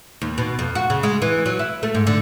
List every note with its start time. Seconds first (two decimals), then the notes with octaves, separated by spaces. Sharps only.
0.22 D#2
0.38 B2
0.59 F2
0.75 F#4
0.90 C#3
1.03 G#3
1.22 E3
1.46 F#3
1.59 E4
1.83 A3
1.95 G#2
2.07 D3